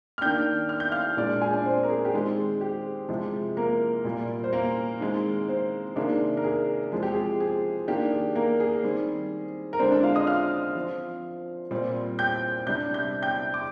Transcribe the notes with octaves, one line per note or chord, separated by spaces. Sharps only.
F6
D#3 A#3 D4 G5 G6
F6
G6
F5 F6
A#2 G#3 D4 D5 D6
G#4 G#5
D4 D5
C4 C5
A#4
G#4
G4
D#3 G#3 C4 G#4
G4
C3 F3 G#3
A#3 A#4
A#2 G3 A#3
C5
A#3 A#4
D#3 G#3 C4
C4 C5
C3 D#3 A#3 D4 G#4
A#4
G#4
F3 G#3 C4 G#4
G4
G#4
G#4
D#3 A#3 D4 G4
G#4
A#3 A#4
G#4
D#3 G3 C4
A#4
D3 G#3 C4 D4 C5
D4 D5
F4 F5
D#5 D#6
F5 F6
F3 C4
A#2 G3 C4
G5 G6
C3 G3 D4 G6
G6
G5 G6
D6